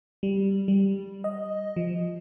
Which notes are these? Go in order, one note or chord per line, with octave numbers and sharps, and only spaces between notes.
G3
G3
D#5
F3